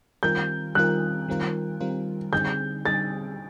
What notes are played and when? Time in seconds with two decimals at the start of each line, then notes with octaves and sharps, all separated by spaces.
0.23 D#3 G3 C4 F4 A#4 G6
0.75 D#3 G3 C4 F4 A#4 F#6
1.28 D#3 G3 C4 F4 A#4
1.80 D#3 G3 C4 F4 A#4
2.33 D3 G3 C4 D#4 G#4 G6
2.85 D3 G3 C4 D#4 G#4 A6